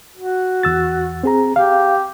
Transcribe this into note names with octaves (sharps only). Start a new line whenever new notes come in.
F#4
E2 E6 A6
C4 G#4 A#5
G4 F5